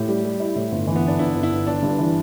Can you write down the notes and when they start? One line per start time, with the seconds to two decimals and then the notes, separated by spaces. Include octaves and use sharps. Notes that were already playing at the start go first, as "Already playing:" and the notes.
Already playing: A2 G4
0.08 G3
0.24 G3
0.40 E4
0.55 A2
0.71 G1
0.87 E3
0.96 B3
1.03 G1 D4
1.19 G1 E4
1.34 G1
1.43 E4
1.51 G1
1.67 G1 D4
1.83 G2
1.99 E3